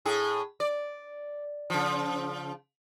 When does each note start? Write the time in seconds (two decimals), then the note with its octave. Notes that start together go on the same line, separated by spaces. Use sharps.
0.05 A2 G#4
0.60 D5
1.70 C#3 F3